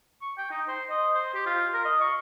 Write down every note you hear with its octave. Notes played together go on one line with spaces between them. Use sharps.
C#6
G5
D#4
C5
D#5
C5
G4
F4
A#4
D#5
C#6